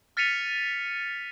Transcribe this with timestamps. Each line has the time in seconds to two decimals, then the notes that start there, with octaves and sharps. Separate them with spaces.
0.17 F6 A6 B6 C#7 D#7 F7